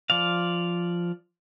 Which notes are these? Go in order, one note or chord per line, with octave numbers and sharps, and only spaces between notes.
F3 D5 F5